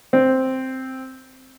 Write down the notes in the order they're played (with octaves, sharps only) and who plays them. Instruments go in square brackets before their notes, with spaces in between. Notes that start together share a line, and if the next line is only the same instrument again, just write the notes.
[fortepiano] C4